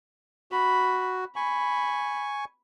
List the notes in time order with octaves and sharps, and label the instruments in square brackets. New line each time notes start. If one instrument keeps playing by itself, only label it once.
[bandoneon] F#4 [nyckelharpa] B5
[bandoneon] G#5 C#6 [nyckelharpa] B5